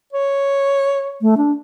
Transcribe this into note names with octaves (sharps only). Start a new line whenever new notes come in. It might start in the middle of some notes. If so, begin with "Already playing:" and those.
C#5
A3
D4